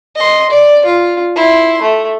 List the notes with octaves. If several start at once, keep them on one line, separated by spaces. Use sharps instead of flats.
D#5 C6
D5
F4
E4 C6
A3